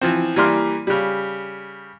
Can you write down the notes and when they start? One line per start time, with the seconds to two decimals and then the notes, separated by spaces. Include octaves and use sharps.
0.01 E3 F3 C4
0.36 E3 G3 A#3 D5 C6 F6
0.87 C#3 G3